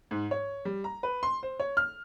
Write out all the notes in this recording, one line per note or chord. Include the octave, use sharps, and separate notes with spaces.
G#2
C#5
G3
A#5
B4
C6
C5
C#5
F6